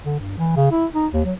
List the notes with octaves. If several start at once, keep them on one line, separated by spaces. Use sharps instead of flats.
D3
G2
E3
C#3
E4
D#4
D#2
F#3